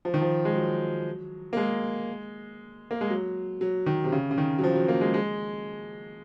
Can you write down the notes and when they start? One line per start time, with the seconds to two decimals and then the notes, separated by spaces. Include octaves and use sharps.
0.05 F3
0.14 D#3
0.22 F3
0.45 G#3
0.56 F#3
1.53 A#3
1.57 G#3
2.91 A#3
3.01 G#3
3.10 F#3
3.61 F#3
3.86 D#3
4.04 C3
4.12 C#3
4.31 C#3
4.38 D#3
4.59 F#3
4.64 F3
4.76 F#3
4.88 A#3
5.01 G#3
5.14 G#3